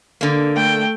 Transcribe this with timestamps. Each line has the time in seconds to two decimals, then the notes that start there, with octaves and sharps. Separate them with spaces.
0.21 D3 A#3
0.55 A3 G5